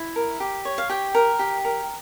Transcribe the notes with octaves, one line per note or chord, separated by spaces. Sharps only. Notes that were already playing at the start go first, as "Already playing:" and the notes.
Already playing: E4
A#4
G4
C#5
F5
G4 G5
A#4
G4
A#4